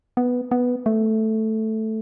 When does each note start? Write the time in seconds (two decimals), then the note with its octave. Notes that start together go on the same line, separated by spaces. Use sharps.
0.17 B3
0.51 B3
0.86 A3